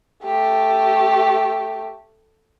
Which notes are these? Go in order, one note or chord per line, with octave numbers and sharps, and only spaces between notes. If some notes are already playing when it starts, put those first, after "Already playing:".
A3 G4